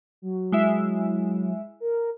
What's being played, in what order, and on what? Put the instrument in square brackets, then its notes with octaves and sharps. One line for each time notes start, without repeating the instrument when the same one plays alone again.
[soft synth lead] F#3
[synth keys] G#3 E4 E5
[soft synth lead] A#4